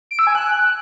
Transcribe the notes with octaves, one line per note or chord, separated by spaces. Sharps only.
D7
E6
G#5
F#6